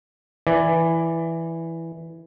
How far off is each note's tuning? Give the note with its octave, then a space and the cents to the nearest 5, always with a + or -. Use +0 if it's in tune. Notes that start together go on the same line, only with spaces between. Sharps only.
E3 +0 D5 +0